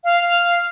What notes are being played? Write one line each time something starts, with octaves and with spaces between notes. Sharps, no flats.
F5